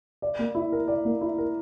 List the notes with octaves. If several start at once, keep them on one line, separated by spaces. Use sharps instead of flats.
D5
A#3
E4
A#4
D5
A#3
E4
A#4